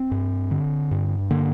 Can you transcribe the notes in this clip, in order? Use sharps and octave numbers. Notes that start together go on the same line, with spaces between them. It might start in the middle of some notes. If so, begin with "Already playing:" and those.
Already playing: C4
G2
D3
G2
D3 A#3